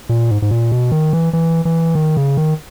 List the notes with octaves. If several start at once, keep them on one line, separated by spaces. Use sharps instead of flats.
A#2
G#2
G#2
A#2
B2
D#3
E3
E3
E3
D#3
C#3
D#3